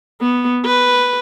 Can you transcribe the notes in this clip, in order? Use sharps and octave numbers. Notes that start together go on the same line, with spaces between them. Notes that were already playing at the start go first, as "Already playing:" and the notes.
B3
B4